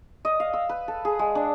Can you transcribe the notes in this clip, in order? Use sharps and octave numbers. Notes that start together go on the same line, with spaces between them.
D#5
F5
E6
B4
A4
G#4
G#3
D4